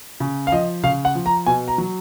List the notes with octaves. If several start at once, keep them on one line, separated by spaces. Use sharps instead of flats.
C#3
F5
F3 D#5
C#3 F5
F#5
F3
A#5
B2 G#5
A#5
F#3